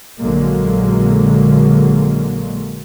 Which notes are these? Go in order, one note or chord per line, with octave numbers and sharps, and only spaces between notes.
A#1 D3 F#3 G#3 A#3